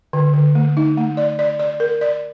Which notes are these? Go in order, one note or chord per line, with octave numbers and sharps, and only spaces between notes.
D3
D3
A3
D#4
A3
D5
D5
D5
A#4
D5